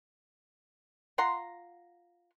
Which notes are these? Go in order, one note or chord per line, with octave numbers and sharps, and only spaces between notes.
F4 F#5 A#5 C6